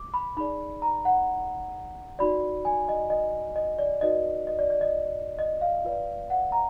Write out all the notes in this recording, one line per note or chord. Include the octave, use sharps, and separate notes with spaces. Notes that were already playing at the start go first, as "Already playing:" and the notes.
Already playing: D6
B5
D#4 G#4 D5 B5
A#5
F#5
D#4 F#4 D5 B5
G#5
D#5
D#5
D#5
D5
D#4 F#4 B4 D5 D#5
D#5
D5
D5
D#5
D#5
F5
F4 B4 D5
F#5
A#5